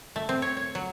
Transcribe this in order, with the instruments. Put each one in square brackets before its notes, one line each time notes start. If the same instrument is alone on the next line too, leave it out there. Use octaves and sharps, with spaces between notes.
[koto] A3
C4
C#5
C#5
F#3